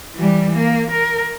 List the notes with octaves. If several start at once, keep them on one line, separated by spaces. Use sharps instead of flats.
E3 G3
A#3
A#4